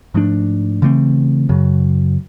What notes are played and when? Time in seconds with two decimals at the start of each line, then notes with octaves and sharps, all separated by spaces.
0.14 G#2 F3 A3 D4
0.82 C#3 E3 A3 C4
1.49 F#2 C#3 F#3